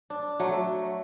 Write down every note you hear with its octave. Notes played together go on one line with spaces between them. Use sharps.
D4
F#3 A3